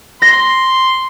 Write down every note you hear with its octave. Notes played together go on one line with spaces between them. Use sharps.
C6 A#6